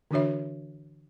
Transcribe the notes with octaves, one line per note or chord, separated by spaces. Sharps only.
D3 E3 D4 F#4 C#5 E5